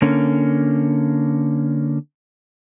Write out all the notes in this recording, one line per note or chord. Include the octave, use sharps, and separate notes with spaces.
D3 A#3 C#4